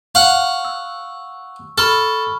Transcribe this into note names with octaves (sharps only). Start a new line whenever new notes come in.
F5 F#5 C#6
E6
A4 B5 C#6 F6